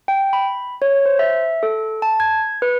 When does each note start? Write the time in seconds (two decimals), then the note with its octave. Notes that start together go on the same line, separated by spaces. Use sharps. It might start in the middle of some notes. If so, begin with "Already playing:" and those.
0.08 G5
0.33 B5
0.82 C#5
1.06 C5
1.19 E5
1.63 A4
2.02 A5
2.20 G#6
2.62 B4